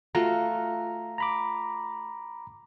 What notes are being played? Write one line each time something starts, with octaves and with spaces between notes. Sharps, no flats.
A3 F4 F#4 A#5
A#5 B5 D6